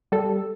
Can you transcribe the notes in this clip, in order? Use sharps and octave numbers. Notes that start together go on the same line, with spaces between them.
G3 A4